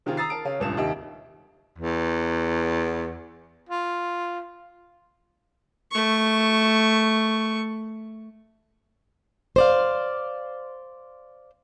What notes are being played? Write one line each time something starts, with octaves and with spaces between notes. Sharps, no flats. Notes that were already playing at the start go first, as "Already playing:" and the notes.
C3 D#3 C4 F4 G#4
A#5 D#6 E6 A6 C7
A#4 A5 D7
C#3 C#4 F5
D#1 C#2 G2 E7
D#2 C3 G4 D#5 E5
E2
F4
A3 C#6
C5 D5 F5